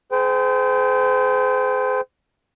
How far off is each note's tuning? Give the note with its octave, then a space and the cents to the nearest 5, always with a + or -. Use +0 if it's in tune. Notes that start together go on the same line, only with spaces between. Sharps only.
G#4 +30 C5 -35 G5 +0